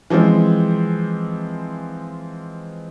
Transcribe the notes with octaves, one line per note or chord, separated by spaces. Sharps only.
E3 F3 G#3 C4 F4